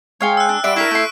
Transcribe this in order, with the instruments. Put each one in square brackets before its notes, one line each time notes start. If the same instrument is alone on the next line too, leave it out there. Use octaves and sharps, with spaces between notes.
[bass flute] G#3 [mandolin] C#5 F5 G5
[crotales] E6 F#6
[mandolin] D4
[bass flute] G3 [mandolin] D5 F#5 C6 [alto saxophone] E5 [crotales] D7
[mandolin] D4 A#4 [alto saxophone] E4 [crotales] C#6 B6
[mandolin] A3 C6 [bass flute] A4